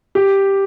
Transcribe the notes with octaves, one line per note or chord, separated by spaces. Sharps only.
G4